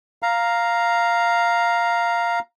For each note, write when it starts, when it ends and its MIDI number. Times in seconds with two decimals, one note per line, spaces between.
0.23 2.39 77
0.23 2.39 82